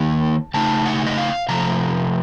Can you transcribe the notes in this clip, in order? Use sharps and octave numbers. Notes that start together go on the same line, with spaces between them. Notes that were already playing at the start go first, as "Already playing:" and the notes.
Already playing: D#3 A#3 D#4 A5
C#3 A3 D#4 A5
F#5
D#5
F5
C3 F3 A3 A#5